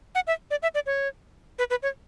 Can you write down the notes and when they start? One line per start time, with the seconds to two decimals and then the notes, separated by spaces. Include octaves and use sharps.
0.15 F#5
0.27 E5
0.51 D5
0.62 E5
0.75 D5
0.86 C#5
1.59 B4
1.70 B4
1.83 C#5